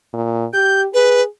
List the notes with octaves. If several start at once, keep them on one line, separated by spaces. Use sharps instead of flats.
A#2
G4 G6
G#4 B4